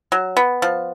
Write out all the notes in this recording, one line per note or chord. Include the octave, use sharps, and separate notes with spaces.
F#3
B3
F3